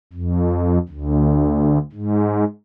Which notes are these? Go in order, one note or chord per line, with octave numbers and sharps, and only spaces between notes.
F2
D2
G#2